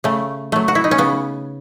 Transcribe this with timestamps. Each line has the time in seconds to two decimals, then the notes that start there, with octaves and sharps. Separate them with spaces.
0.04 C#3 A3
0.52 F#3 A3
0.68 F#4
0.75 E4
0.84 D#4
0.91 C#4
0.98 C#3 B3